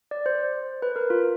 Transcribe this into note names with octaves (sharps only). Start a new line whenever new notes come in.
D5
C5
B4
A#4
F4